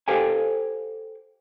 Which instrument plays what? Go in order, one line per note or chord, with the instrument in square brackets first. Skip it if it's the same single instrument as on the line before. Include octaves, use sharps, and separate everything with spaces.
[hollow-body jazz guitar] G4 A4 C5 F5 G5 G#5